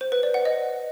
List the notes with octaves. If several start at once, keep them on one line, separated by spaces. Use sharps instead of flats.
C5
B4
D5
F#5
D#5